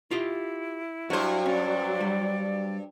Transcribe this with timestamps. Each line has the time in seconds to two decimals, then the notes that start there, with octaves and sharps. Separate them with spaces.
0.11 E4 F4 G4 D#5
1.10 G2 F#3 F#4 C5
1.46 C#4 D5
2.01 G3